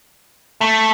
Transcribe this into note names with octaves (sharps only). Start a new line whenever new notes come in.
A3